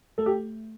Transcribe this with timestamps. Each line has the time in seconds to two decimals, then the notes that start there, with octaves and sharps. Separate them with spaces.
0.18 A3 A4
0.26 G4